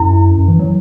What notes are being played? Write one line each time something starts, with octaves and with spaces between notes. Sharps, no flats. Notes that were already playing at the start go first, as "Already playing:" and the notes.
Already playing: F#2 E4
F#2
E3
F#3